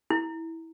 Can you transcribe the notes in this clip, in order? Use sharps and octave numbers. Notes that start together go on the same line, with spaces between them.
E4